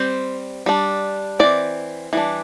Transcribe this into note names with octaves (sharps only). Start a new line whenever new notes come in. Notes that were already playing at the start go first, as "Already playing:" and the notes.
Already playing: G3 C4 C5
G3 D4
E3 C4 D5
E3 G3 D4